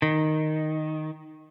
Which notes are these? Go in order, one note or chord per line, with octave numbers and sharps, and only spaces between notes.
D#3